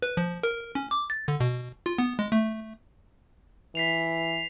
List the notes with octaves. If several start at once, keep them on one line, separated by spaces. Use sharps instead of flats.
B4
F3
A#4
C#4
D6
A6
D3
B2
F4
B3
G#3
A3
E3 B6 C7 F7